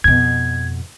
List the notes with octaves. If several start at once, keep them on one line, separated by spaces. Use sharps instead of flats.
F2 B2 G#6